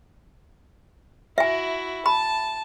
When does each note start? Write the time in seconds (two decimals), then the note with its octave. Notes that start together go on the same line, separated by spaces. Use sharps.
1.38 E4 F#4 E5 G#5
2.06 A5 B5